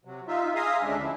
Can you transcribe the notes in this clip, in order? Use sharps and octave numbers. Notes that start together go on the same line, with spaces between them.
C3 F#3
D#4 F4 E5
G#4 E5 F5 A#5 C6 D#6
D2 C#3 G#3 D4 E5
F3 E4